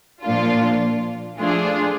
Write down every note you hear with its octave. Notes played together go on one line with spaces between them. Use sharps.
A#2 F3 A#3 D4 F4
F3 A3 D4 F4 G#4